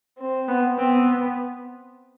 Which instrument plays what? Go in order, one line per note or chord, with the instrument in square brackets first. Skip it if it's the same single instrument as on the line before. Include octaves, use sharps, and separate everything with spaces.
[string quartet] C4
[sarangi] B3
[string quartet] B3 [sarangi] C4